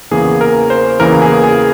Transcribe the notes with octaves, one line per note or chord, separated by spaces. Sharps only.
E2 C#3 E3 A#3 G#4
A#4
C5
E2 C#3 E3 A#3 A#4
G#4
G#4